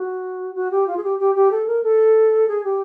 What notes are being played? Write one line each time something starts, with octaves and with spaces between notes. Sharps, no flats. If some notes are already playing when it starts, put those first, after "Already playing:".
Already playing: F#4
F#4
G4
F4
G#4
G4
G4
G4
A4
A#4
A4
G#4
G4